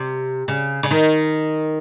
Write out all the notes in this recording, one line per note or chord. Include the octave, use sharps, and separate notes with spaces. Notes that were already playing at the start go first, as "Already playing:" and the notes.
Already playing: C3
C#3
C#3
D#3